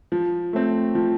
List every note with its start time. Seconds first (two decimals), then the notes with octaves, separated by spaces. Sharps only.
0.12 F3
0.53 A3 C4
0.95 F3